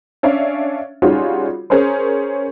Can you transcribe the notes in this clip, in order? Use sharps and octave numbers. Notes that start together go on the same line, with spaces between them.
C#4 D4 E5 F5
G3 C#4 D#4 F4 F#4 G#4
C#4 G#4 A#4 C5